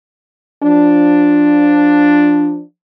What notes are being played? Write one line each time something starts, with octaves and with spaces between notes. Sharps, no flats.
F3 D4